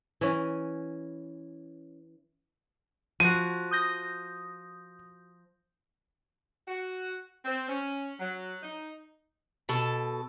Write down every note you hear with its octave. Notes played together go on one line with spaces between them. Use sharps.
E3 C#4
F3 F#4 D#7
D#6 G6 A#6
F#4
C4
C#4
F#3
D#4
B2 A4